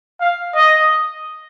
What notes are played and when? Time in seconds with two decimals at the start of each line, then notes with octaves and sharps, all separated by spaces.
0.21 F5
0.55 D#5